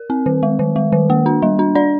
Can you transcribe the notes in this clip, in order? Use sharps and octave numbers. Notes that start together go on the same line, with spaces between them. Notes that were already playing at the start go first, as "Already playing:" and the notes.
Already playing: A#4
C4
D#3
G#3
D#3
G#3
D#3
A#3
D4
G3
D4
D4 D5